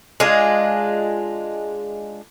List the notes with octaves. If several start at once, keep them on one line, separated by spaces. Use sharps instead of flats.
G#3 D4 F4